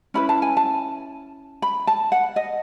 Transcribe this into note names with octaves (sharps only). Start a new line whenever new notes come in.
C#4 E4 B4 B5
A5
G#5
A5
B5
A5
F#5
D#5